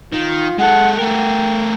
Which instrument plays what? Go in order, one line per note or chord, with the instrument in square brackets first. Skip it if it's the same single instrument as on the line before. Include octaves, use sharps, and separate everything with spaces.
[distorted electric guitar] D#3 [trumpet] F4
[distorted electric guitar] G#3 A4 [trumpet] F#5
[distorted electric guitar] A3 A#4 [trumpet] G5